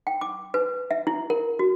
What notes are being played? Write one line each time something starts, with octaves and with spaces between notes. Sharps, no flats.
G5
D6
B4
E5
E4
A#4
F#4